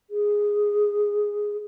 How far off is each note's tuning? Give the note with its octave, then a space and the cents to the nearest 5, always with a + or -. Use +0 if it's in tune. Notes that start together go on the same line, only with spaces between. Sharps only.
G#4 -5